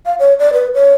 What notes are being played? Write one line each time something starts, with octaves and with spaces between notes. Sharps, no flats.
F5
C#5
D5
B4
C#5